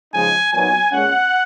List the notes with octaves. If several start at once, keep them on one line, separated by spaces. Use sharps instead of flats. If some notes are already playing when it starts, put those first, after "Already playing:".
C#3 F3 G#3 D#4 G#5
A#2 F#3 B3 D#4 G#5
A#2 G#3 C#4 F#5